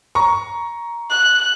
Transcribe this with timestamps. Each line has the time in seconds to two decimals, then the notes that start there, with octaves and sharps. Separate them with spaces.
0.15 A#5 C#6
1.10 F#6